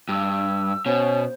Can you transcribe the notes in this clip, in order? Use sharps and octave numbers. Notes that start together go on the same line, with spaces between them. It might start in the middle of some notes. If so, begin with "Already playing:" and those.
G2 E6
B2 C#4 C5